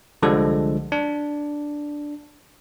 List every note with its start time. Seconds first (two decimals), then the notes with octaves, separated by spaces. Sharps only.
0.22 C2 D3 F3 G3 G#3 A4
0.92 D4